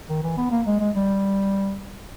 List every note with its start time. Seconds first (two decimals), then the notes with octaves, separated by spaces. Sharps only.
0.09 D#3
0.23 E3
0.37 B3
0.51 A#3
0.67 G#3
0.80 G#3
0.96 G3